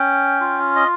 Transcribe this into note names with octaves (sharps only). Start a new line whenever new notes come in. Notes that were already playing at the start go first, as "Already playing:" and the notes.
Already playing: C#4 G5
F4
D#5